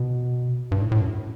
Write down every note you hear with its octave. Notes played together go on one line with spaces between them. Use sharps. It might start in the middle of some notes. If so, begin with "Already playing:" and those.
Already playing: B2
G2
A2
A2
F#2